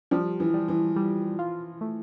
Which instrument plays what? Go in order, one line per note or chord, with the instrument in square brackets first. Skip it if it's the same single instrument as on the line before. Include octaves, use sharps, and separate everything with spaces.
[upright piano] F3 [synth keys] G3
[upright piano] E3
[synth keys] G3
[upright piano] E3
[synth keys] G3
F4
A3